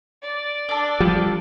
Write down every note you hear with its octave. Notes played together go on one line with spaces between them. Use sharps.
D5
D4 A4
F3 G3